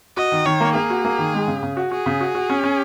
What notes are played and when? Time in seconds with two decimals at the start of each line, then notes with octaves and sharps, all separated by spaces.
0.17 F#4 D#5
0.32 D#3
0.46 D#3 C#5
0.61 A#3
0.75 A#3 G#4
0.90 F#4
1.05 A#3
1.19 D#3
1.34 G#3
1.47 C#3
1.63 C#3
1.77 F#4
1.91 F#4 G#4
2.06 C#3
2.21 F#4
2.35 F#4
2.50 C#4
2.64 C#4